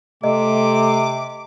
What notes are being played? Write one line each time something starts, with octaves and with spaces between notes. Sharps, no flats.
C3 A3 D#5 D6